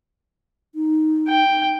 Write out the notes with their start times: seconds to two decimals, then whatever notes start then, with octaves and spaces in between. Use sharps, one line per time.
0.75 D#4
1.28 G5